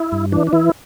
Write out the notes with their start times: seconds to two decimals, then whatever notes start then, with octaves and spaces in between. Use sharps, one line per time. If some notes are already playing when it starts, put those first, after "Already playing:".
Already playing: E4
0.12 G2
0.32 E3 D4
0.47 D4
0.53 E3 E4